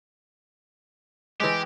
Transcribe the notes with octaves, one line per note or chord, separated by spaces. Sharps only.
E3 G#3 G4